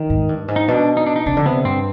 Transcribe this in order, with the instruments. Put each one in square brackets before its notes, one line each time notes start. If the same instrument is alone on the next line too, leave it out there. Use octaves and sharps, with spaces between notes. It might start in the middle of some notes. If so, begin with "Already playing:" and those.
Already playing: [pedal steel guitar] D#3
[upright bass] G#2
G2
G#2
[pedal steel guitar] D#4
[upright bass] B2 [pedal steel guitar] D4
[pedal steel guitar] D#4
D4
D#4
[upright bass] C3 [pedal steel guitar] D4
[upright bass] D3
[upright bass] C3 [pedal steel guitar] B3
[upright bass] G2 [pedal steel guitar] C4